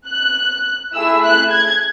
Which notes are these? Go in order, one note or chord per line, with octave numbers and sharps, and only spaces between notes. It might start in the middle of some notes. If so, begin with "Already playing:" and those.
F#6
A3 E4 G#4 E6
F#6
G#6